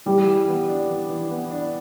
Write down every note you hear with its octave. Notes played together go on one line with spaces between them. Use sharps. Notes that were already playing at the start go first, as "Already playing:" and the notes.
E3 G3
E3
B3
D4
E3
E3
B3
D4